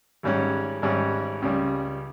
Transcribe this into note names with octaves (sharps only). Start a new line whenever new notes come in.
G#1 G#2 G3 C#4
G#1 G#2 G3 C#4
C#2 C#3 G3